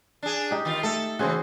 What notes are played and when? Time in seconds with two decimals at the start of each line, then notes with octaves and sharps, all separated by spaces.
0.23 D4 G#4
0.51 D#4 G4
0.65 D#3 F4
0.83 A3 A4
1.19 C#3 E3 F#4 G#4 C5